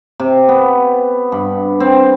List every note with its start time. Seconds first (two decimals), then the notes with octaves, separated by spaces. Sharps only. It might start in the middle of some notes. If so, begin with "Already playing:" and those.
0.20 C3
0.49 B3
1.32 G2
1.80 C4